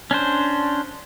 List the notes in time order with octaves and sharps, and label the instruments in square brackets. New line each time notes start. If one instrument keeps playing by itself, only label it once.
[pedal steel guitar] C#4 D4 C5